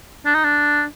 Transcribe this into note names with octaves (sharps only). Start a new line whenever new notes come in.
D4
D#4
D4